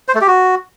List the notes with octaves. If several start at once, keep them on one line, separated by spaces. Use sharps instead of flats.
C5
A3
G4
F#4